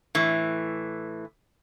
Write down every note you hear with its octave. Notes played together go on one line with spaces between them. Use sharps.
A2 E3